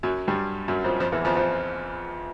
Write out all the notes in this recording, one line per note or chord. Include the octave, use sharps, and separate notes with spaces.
F#2 F#3
G2 G3
F#2 F#3
F2 F3
F2 F3
E2 E3
F2 F3
F2 F3